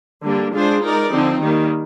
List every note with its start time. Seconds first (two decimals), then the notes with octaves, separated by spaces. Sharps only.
0.23 D3 G3 A#3 D4
0.52 G#3 D4 F4 G#4 C5
0.82 G#3 D#4 A#4 D5
1.11 D3 F3 C4 D#4
1.41 D#3 G3 A#3